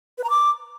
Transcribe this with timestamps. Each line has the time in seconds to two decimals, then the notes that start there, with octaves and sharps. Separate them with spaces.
0.18 B4
0.24 A#5
0.30 D6